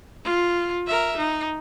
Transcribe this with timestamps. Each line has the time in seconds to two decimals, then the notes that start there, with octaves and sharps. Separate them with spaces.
0.24 F4
0.87 A#4 E5
1.17 D#4